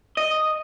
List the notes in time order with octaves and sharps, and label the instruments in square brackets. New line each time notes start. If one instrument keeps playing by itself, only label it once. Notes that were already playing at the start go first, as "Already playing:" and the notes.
[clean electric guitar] D#5